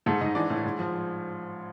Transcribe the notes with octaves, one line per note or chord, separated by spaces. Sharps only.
G#2 A3 A4
G#2 D#4 D#5
E3 D4 D5
A2
G#2
F3